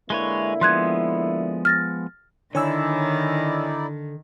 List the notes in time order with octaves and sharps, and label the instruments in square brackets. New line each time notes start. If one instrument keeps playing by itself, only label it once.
[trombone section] D3 A#3 E4 [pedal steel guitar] G#3 B4 C#5
[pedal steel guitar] F3 G#3 B3 [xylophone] C6 F#6 G#6
[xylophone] F6 A6 A#6
[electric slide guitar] D3 [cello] D#3 [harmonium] D#4 E4 D5 [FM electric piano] C#5 G#5 E6